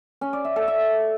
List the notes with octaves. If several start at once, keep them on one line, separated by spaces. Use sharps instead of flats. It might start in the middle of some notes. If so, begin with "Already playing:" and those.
C#4
D5
E5
A4
E5